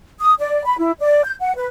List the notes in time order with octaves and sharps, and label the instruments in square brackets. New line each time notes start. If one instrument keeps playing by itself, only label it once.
[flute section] D#6
D5
B5
E4
D5
G6
F#5
B4